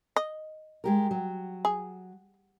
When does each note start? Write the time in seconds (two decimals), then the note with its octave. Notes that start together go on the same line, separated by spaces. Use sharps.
0.16 D#5
0.84 G#3 G4 A#4
1.11 F#3
1.65 G#4